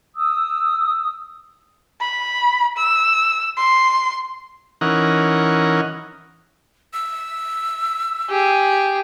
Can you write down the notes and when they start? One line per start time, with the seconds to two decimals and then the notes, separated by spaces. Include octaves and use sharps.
0.15 D#6 E6
2.01 B5
2.77 E6
3.57 C6
4.81 E3 C#4 D#4 A#4 F#5
6.94 E6
8.30 G4 G#4